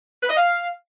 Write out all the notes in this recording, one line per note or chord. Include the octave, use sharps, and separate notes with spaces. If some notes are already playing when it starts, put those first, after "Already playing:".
B4
D#5
F5